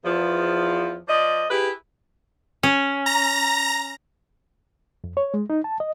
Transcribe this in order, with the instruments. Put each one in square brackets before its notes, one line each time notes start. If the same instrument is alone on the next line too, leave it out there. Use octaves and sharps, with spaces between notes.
[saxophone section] E2 F3
F3 D5 D#5
E4 G4 G#4 B4
[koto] C#4
[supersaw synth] A#5 A#6
[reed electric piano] F2
C#5
G#3
D#4
A5
D#5